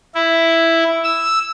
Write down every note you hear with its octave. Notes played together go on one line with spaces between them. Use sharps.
E4
E6